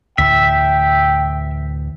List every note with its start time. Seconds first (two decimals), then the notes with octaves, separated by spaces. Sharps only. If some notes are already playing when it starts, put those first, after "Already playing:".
0.18 D2 A2 E3 E5 G5